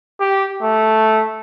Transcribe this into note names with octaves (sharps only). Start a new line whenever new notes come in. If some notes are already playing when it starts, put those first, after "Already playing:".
G4
A3